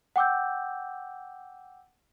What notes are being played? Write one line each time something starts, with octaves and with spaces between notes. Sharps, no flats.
F#5 G5 D6 E6 G6